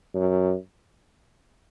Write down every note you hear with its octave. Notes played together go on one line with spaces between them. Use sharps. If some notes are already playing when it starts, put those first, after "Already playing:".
F#2